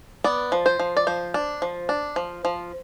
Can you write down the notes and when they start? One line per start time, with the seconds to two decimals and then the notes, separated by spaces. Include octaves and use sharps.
0.24 B3 D5
0.52 F3
0.66 C5
0.79 F3
0.97 D5
1.07 F3 C5
1.34 D4
1.62 F3
1.89 D4
2.16 F3
2.45 F3